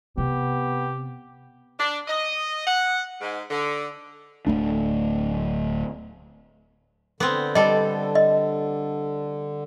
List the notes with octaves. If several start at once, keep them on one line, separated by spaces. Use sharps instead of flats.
C3 B3 G4
D4
D#5
F#5
G#2
D3
D1 F2 A3 D4
D3 B3 C4
G3 A4 D#5
D#5